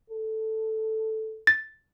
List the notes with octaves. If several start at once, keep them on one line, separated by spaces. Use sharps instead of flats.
A4
A6